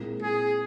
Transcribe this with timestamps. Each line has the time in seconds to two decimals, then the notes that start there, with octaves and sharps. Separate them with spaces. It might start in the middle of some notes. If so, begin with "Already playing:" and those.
Already playing: A#2 G#3 C4 E4 A#4
0.23 G#4